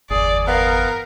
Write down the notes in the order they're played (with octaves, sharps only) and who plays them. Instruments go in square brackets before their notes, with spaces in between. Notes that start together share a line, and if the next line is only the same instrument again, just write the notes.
[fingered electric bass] G1 E2 [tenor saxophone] G#4 [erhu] D5
[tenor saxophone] B3 [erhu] A#4 [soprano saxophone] F5